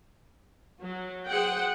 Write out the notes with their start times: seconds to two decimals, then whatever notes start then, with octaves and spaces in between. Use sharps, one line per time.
0.81 F#3
1.27 G#4 C5 F#5 G5